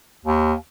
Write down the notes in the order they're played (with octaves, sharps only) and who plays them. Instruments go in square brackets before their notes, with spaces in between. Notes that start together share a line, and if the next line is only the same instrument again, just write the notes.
[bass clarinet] D#2